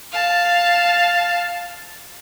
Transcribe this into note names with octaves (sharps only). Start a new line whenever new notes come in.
F5 A5